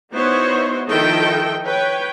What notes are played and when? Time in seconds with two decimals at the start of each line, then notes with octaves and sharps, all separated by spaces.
0.13 B3 D#4 E4 F#4 C5 C#5
0.89 D#3 F3 E4 A4 D#5 G5
1.64 B4 C#5 G5